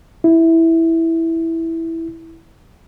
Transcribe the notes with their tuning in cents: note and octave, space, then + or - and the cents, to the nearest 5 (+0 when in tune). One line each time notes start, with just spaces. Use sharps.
E4 -5